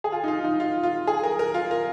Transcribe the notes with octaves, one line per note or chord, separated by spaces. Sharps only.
G#4
F4
D#4
F4
D#4
F4
F4
G#4
A#4
A#4
F4
A#4